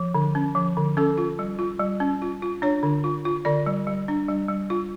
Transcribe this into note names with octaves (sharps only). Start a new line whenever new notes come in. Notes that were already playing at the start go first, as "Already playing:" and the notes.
Already playing: F3
D3
C#4
F3
D3
C#4 A4
F4
G3
F4
G3
C#4
F4
F4
D4 C#5
D3
F4
F4
D3 D5
G3
G3
D4
G3
G3
F4